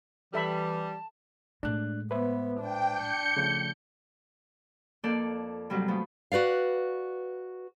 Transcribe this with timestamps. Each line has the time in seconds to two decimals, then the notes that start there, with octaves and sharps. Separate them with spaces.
0.34 E3 G3 A4 E5 A5 B5
1.63 A2 G#3 D4 F#6
2.11 B3 B4 C5 E5
2.61 D4 G5
2.91 G6 C#7
3.37 C#3 F3 A3
5.03 F2 A#3 D4 A4 D5 G6
5.70 G#2 C3 F#3 G3
5.88 F3 A3 B3
6.32 F#4 B4 D5 F5